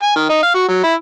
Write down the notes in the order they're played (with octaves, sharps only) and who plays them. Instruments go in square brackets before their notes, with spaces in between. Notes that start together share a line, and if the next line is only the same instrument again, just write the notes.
[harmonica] G#5
D#3
D#4
F5
F#4
F#3
E4